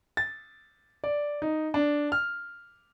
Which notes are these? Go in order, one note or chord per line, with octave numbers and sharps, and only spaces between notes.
A6
D5
D#4
D4
F6